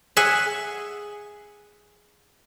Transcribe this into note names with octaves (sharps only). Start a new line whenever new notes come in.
G#4 E5 F#5 G#5